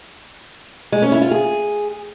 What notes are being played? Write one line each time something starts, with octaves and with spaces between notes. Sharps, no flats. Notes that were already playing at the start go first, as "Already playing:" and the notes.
G#3
C#4
E4
F4
G#4